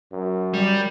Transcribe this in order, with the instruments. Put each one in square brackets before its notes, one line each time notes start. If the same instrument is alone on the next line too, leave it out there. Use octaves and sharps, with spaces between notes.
[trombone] F#2
[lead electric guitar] G3